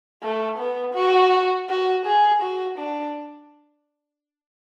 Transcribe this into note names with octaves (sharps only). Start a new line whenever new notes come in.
A3
B3
F#4
F#4
G#4
F#4
D4